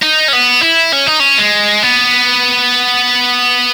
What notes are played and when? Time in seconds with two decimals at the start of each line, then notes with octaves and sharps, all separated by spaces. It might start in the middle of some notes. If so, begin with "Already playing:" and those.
0.02 D#4
0.28 C#4
0.33 B3
0.62 E4
0.93 C#4
1.06 D#4
1.20 C#4
1.38 G#3
1.83 B3